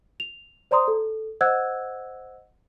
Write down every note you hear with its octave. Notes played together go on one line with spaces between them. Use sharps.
F7
C5 D5 A#5 C6 D#6
A4
C5 D#5 F#5 E6 F#6 G#6